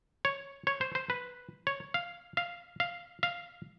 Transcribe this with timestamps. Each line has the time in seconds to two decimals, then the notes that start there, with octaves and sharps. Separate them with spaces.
0.25 C#5
0.67 C#5
0.81 C5
0.95 C5
1.10 B4
1.67 C#5
1.94 F5
2.37 F5
2.80 F5
3.23 F5